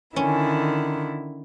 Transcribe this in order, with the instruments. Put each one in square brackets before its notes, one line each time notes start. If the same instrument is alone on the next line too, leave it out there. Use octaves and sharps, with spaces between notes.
[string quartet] D3 D#3 E4 [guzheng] C#4